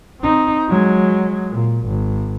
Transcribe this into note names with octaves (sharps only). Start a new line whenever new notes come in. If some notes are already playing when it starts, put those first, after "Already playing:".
C4 D#4
F#3 G#3
A#2
G#1